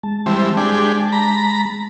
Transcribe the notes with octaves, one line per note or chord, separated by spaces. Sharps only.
G#3 A5
E3 G3 C4
D4 G4 G#4
A#5 B5